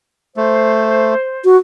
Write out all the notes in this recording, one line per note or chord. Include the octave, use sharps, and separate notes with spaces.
A3 C5
F#4